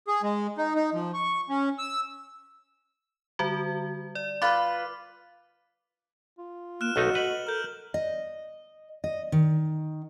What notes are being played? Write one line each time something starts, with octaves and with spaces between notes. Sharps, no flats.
G#4
G#3
D#4
D#4
F3
C#6
C#4
E6
D3 G3 F#4
D5
F4 B4 D6
F4
A#3 F6 F#6 E7
B1 A3 D#4 F#4 A4
B4 D#5 F#7
A4 A#4 F6 G6
D#5
D#5
D#3